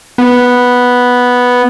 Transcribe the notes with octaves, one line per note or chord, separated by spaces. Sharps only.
B3